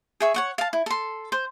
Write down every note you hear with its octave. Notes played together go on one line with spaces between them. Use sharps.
G#4 E5 C#6
C#5 F#5 C#6
F5 A5
E4
A4 C6
C5